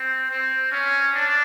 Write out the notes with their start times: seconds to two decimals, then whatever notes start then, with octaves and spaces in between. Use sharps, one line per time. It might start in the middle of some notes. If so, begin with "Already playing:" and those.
Already playing: C4
0.31 C4
0.72 C#4
1.14 D4